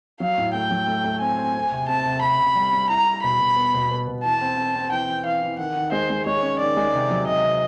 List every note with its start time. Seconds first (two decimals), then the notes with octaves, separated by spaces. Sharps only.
0.20 F#3 F5
0.38 A2
0.54 A3 G5
0.71 F#3
0.87 A3
1.04 A3
1.21 C4 G#5
1.38 C4
1.55 C4
1.72 C3
1.88 C4 A5
2.06 C3
2.22 C3 B5
2.40 C3
2.55 G3
2.73 G3
2.89 E4 A#5
3.06 E4
3.23 B2 B5
3.40 B2
3.56 B3
3.74 B2
3.91 B3
4.07 B2
4.24 E3 A5
4.41 C4
4.57 C4
4.75 C4
4.92 E3 G5
5.09 E3
5.25 E3 F5
5.43 E3
5.58 D#3 F#5
5.75 D#3
5.92 G#3 C5
6.10 G#3
6.26 G#3 C#5
6.42 C#4
6.59 D#3 D5
6.77 G#3
6.93 C3
7.10 F#3
7.27 C3 D#5
7.44 C3